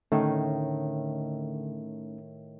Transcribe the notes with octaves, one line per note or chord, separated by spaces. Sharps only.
A2 D3 D#3 A3 C#4 D#4